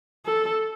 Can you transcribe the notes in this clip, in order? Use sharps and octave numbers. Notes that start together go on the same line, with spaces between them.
A4